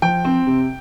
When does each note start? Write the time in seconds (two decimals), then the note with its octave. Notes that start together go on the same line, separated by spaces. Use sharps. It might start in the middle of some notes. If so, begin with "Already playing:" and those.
0.02 F3 G5
0.25 C4
0.47 C3